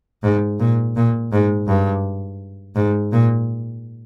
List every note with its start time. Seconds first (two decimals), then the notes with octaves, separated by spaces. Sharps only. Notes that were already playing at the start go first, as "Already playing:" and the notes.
0.23 G#2
0.60 A#2
0.96 A#2
1.32 G#2
1.67 G2
2.76 G#2
3.12 A#2